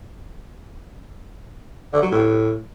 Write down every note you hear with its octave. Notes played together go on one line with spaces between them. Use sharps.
D3
F#3
A2